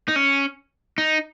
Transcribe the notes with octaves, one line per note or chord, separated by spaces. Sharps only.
D#4
C#4
D#4